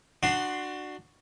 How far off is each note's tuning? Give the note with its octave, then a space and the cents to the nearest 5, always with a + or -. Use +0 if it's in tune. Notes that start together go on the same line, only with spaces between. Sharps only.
D4 +25 F#4 +0 C6 +0